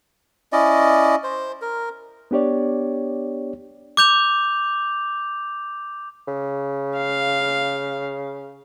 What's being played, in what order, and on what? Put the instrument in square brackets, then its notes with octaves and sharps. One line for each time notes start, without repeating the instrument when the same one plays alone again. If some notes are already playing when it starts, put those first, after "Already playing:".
[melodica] C#4 E4 D5 D#5
C5
A#4
[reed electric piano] B3 D4 G4 C#5 D5
[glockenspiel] D6 G6 F7
[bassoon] C#3
[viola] F5